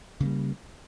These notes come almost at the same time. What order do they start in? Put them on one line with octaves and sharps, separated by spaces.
C#3 A#3 G3